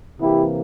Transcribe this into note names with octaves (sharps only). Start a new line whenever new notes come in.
C3 E3 A#3 E4 G4